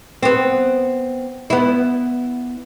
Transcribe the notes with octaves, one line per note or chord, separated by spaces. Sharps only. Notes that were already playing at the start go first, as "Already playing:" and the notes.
B3 C4
B3 E4